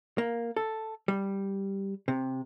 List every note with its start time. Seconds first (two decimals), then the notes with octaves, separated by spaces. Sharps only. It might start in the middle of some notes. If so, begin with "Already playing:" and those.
0.18 A#3
0.56 A4
1.08 G3
2.08 C3